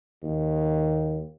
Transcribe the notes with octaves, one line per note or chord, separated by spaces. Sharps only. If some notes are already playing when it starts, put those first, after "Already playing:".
D#2